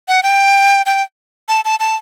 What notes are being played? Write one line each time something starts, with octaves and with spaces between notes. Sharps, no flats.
F#5
G5
G5
A5
A5
A5